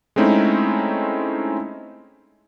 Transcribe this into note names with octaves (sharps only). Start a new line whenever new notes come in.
G#3 A3 C4 C#4 D#4 E4